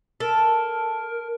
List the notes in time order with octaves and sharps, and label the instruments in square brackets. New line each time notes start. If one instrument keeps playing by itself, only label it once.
[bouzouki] A4 [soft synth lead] A#4